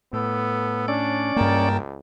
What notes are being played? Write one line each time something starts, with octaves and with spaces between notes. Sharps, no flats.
A2 B3 A4
C#4 D4 D5
C#2 G2 A#3 A#4 G5 A5